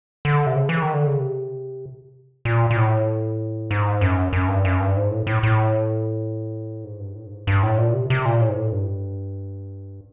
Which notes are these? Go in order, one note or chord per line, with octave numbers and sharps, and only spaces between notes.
D3
C3
C#3
E3
D#3
D3
C#3
C3
A#2
A#2
A2
G#2
F#2
F#2
G2
F#2
G2
G#2
A2
A2
A2
G#2
G2
A2
G2
G#2
G2
A2
A#2
C3
C3
A#2
A2
G#2
A2
G2